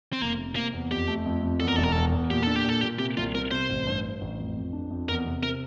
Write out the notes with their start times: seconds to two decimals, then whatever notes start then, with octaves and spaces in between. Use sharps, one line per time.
0.13 C4
0.21 F1 A#3
0.38 C3
0.56 C3 A#3
0.73 E2
0.91 F2 G4
1.08 A3
1.26 F2
1.43 F2
1.60 E2 A4
1.68 A#4
1.76 E1 A4
1.83 A#4
1.92 E2 A4
2.12 E2
2.30 A#2 G4
2.43 D4 A4
2.56 G4
2.64 A#2 A4
2.81 A#2 G4
2.99 C3 G4
3.17 C2 F4
3.35 C3 A#4
3.51 C3 C5
3.69 A1
3.86 G2
4.04 G2
4.21 A1
4.39 F2
4.56 F2
4.73 D4
4.90 F2
5.09 E2 A#4
5.26 C3
5.43 C3 A#4